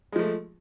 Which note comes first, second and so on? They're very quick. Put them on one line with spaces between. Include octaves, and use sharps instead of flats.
G#3 F3 A3